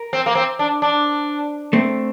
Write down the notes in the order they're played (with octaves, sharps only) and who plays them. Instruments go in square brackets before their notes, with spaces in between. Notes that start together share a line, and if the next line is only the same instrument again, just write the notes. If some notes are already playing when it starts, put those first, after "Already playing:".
Already playing: [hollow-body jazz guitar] A#4
[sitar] C4
A#3
C4
D4
D4
[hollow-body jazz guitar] A3 C4